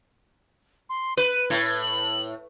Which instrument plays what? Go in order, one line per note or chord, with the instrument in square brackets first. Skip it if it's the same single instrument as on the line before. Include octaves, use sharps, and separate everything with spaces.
[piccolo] C6
[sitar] B4 [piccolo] D#7
[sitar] A2 [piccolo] G#6
[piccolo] F#7